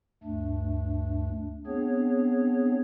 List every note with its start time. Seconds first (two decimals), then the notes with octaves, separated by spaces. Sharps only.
0.24 D2 G2 A3 D4
1.67 B3 C4 D4 G#4 C#5